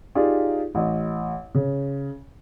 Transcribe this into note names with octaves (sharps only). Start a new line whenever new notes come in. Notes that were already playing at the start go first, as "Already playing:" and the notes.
D#4 F4 G4 G#4 D5
A1 D#5
C#3